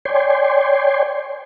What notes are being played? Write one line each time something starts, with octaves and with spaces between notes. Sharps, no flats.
C#5 D5 G5 G#5 C6